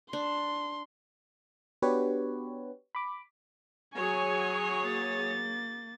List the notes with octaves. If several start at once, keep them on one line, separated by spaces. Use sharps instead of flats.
D4 C6
B3 D4 F#4 G4 B4 C#5
B5 D6
F#3 G#4 C#5 G#5 C#6
A#3 A6